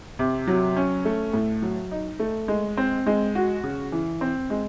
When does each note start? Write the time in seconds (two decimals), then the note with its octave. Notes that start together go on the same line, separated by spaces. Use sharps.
0.19 C3
0.47 F#3
0.76 C#4
1.05 A3
1.33 A2
1.62 F#3
1.91 D#4
2.20 A3
2.48 G#3
2.77 C4
3.07 G#3
3.35 F#4
3.64 C#3
3.92 E3
4.21 C4
4.50 G#3